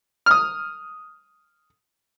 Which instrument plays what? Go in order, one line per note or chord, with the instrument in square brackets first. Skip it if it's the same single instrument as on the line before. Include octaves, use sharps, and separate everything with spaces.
[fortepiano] D#6 F6